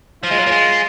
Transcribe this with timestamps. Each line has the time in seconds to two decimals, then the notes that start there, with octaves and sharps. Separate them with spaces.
0.24 F3 F4
0.31 G#3
0.38 F#3
0.47 A#3
0.51 G#3